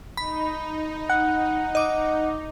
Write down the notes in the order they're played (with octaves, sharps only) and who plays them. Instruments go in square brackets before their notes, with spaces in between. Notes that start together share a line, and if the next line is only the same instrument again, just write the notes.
[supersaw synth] D#4 [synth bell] B5
[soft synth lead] F#5
[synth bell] D#5 D6